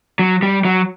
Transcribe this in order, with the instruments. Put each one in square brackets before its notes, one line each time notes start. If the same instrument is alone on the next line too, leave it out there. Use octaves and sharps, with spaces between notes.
[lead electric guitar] F#3
G3
F#3